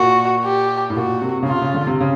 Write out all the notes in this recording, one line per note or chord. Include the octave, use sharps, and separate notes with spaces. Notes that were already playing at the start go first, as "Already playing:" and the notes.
Already playing: A#2 F#4
G4
A2
A#2 F#4
C3
C#3
C3 F4
C#3
D3
C3
C#3